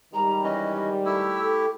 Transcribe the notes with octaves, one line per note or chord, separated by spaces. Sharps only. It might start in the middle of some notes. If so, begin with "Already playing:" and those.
G#2 D#3 G3 A#5
E3 C#4 D#5
A3 E4 G4 E6
A4 G5 D6